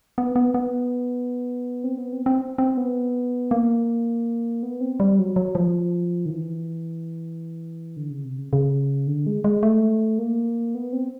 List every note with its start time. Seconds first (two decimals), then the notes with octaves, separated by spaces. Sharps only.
0.18 B3
0.36 B3
0.54 B3
1.84 C4
1.98 B3
2.13 C4
2.26 C4
2.58 C4
2.77 B3
3.51 A#3
4.63 B3
4.81 C4
5.00 G3
5.19 F#3
5.36 F#3
5.55 F3
6.26 D#3
6.30 E3
7.97 D3
8.10 C#3
8.24 C3
8.38 C#3
8.53 C#3
9.07 D3
9.27 G#3
9.44 G#3
9.63 A3
10.19 A#3
10.75 B3
10.93 C4